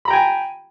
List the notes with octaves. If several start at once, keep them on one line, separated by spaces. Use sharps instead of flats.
G5 G#5 A#5 B5